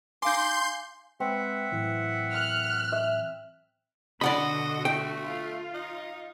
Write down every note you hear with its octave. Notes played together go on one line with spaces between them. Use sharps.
D#4 F5 G#5 C6 D6 G6
G#3 C4 B4 E5 F#5
A2 E3 F#3
F6 F#6
E5
B2 D3 F#4 D5 D#5 F#5 B5
A3 G5
F4
D#4